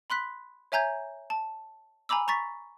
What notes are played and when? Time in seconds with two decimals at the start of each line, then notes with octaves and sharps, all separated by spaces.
0.10 B5 C6 F#6 B6
0.72 C#5 E5 G#5 A#5 G6 G#6
1.30 A5
2.09 G#5 A#5 B5 D6 E6
2.28 A#5 C#6 A6 B6